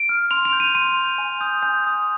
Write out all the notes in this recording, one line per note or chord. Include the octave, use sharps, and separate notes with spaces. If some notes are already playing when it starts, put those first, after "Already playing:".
Already playing: D7
F6
C6 F7
F7
G6
D#7
C6 D#7
G6
G#5
D#6 G6
G#5 G6
D#6 G6